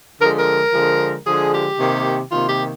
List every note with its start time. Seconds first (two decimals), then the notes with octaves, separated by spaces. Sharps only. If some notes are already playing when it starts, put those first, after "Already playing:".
0.20 D3 F3 G#3 A#4
0.39 A#4
0.73 D3 F3 G#3
1.25 D3 F3 G#3 G#4
1.53 G4
1.79 C3 D#3 A#3
2.32 C3 D#3 A#3 F4
2.49 G4